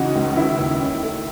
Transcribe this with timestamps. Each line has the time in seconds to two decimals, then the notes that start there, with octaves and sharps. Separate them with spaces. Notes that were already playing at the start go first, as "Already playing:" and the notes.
Already playing: C#3 E3 D#4 F#4
0.15 C#2
0.37 D#3 E4
0.59 D#2
0.80 C#4
1.03 A3